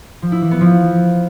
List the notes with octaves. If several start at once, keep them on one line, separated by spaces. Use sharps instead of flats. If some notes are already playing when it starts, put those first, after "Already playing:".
F3
E4
E3
B3
F3